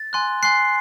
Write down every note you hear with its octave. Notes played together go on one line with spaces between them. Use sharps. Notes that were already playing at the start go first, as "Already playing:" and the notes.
Already playing: A6
G#5 C6 F#6
G#5 C6 F#6 C7